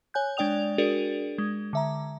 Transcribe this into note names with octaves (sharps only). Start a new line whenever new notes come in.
C#5 G#5 F#6 G6
G#3 D4 D5 G5 D#6 F7
D4 F#4 G#4 A#4 D5
G#3
D3 E5 A#5